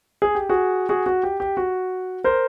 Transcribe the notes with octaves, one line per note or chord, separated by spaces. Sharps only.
G#4
G4
F#4 G#4
F#4 G#4
F#4
G4
G4
F#4
A#4 C5